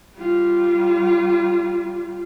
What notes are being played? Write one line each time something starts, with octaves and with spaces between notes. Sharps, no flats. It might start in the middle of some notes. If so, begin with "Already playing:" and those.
G3 F4